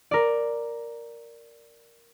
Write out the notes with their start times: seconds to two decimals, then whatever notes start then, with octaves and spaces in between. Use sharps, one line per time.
0.11 A#4 D5